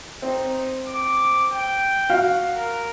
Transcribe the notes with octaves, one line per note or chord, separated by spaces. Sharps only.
C4 D#4
D6
G5
F#4 F5 F#5
A#4